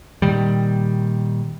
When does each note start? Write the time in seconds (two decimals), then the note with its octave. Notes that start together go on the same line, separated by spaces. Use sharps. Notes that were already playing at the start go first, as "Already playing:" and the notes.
0.22 A#2 D#3 G3